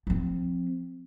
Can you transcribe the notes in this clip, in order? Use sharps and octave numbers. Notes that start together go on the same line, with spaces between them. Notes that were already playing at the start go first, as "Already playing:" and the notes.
F3 C4